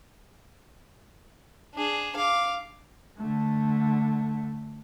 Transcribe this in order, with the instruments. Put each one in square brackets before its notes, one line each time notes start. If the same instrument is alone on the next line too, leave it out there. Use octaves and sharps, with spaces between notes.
[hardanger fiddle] D4 G#4
F5 D6
[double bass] D3 A3